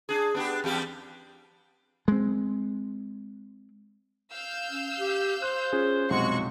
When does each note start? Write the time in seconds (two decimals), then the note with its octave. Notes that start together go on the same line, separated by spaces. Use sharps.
0.09 D4 G#4
0.34 B3 D4 G4
0.64 E2 G3 G4
2.08 G#3 C4
4.32 F5 E6 G6
4.69 C#4
4.99 G4
5.42 C5 F#6
5.73 C#4 F4 G#4
6.10 B1 F2 C3 G#3 F#4 C#6